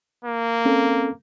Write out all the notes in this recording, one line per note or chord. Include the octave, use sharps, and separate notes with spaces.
A#3
C4 C#4 A4